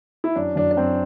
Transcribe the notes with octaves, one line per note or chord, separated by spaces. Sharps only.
E4
F#2 D4
F#2 D4
D4
F#2 C4